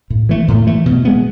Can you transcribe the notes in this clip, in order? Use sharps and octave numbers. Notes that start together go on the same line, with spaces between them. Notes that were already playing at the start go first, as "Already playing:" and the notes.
A2
E3 A3
A2
E3 A3
B2
G#3 B3